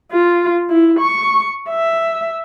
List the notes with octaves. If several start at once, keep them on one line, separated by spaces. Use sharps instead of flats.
F4
E4
C#6
E5